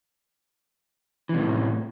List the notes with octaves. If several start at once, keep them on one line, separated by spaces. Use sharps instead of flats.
A2 C3 E3